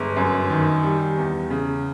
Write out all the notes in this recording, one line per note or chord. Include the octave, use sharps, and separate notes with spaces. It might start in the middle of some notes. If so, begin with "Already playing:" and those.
Already playing: G1 G#3
F#2
D#3
G3
E2
C#3